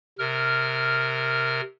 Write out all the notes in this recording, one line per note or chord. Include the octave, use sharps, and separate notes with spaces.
C3 A#4 F6